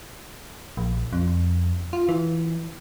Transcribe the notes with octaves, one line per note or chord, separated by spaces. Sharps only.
A#1
F2
F4
E3